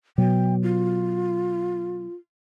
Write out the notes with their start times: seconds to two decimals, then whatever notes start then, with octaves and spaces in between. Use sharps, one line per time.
0.18 B2 F#3 G5
0.63 F4